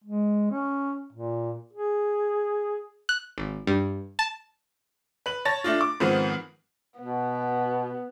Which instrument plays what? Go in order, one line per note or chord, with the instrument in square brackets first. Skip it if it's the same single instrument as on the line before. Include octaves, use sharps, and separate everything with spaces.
[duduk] G#3
C#4
A#2
G#4
[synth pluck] F#6
G#1
G2
A5
[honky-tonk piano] B4 F#7
C#5 A5 A6 A#6
A3 D4 F4
D6
G#2 D#3 F3 B3 C4 F4
[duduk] B2 [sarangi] B3